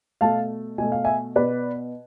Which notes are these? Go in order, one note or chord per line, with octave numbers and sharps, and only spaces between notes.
B2 A3 F5 A5
B2 A3 G#5
F5
E5 G#5
B2 B3 B4 D5